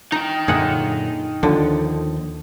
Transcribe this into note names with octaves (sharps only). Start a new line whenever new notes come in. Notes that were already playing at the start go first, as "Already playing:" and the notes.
D#4 G5 A#5
F#2 A#2 D3 G#4 F#5
D#2 D3 F3